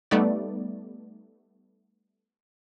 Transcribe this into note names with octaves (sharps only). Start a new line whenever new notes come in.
G3 A3 B3 D#4 D5